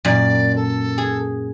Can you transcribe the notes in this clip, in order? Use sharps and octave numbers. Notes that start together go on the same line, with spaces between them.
F#2 A#2 D5
A4
G#4